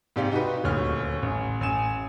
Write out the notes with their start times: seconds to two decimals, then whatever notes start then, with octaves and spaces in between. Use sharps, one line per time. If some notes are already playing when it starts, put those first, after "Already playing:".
0.16 G#2 C3 G4 D5 F5
0.31 D#4 F#4 G4 B4
0.64 D#1 D2 C#5 F6
1.23 A1
1.61 A1 G#5 E7